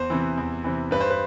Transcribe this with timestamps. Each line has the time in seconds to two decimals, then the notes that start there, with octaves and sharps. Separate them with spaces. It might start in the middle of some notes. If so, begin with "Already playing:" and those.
Already playing: E2 C5
0.10 C3 E3
0.37 E2
0.64 C3 E3
0.91 G2 B4
1.00 C5
1.11 B4